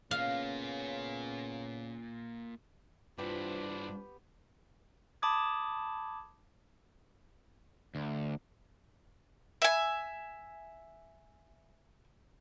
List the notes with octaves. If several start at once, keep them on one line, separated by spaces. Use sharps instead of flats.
C#3 A#3 B3 C#4 F4 F5
G2 B3 D4 E4 F4 G4 C5
A5 B5 D6 D#6 G#6
D2
E5 G#5